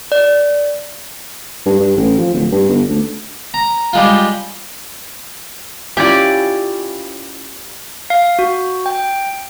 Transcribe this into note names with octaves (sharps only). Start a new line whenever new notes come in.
D5
G2
G2
A1
F3
D1
G2
G1
D2
A#5
G3 G#3 F4
C#4 E4 F4 G4 D5
F5
F#4
G5